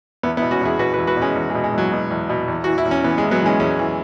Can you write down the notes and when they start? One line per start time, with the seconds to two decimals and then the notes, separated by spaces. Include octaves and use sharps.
0.23 E2 B3 E4
0.37 B3 E4
0.42 B2
0.51 C#4 F#4
0.61 E2 E4 G#4
0.79 B2 F#4 B4
0.93 F#4 B4
0.98 E2
1.07 F#4 B4
1.17 B2 G#3 C#4
1.36 E2
1.50 G#3
1.54 B2
1.64 G#3
1.73 E2 F#3
1.92 B2
2.11 E2
2.29 B2
2.48 E2
2.64 E3 F#4
2.78 E4
2.85 E2
2.91 C#4
3.04 E3 B3
3.18 G#3
3.22 E2
3.31 F#3 B3
3.41 E3 G#3 C#4
3.60 E2 G#3 C#4
3.79 E3